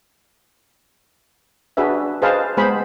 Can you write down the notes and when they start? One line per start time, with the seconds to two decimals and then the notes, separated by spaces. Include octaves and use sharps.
1.77 D4 F#4 G#4 B4 E5
2.22 G#4 B4 C5 D#5 F5 A5
2.57 G#3 B3 G#4 C5 B5